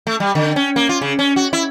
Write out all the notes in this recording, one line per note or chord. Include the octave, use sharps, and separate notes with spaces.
A3
G3
D3
C#4
A#3
F4
C#3
C#4
F#4
E4